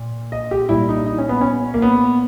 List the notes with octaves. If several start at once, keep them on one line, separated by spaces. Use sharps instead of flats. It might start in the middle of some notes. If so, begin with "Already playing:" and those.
Already playing: A#2
D#5
G4
A#2 G3 E4
D#4
D#4
C#4
B3
C#4
A#3
B3